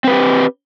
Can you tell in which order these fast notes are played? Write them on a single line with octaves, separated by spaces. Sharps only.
C4 B4 G4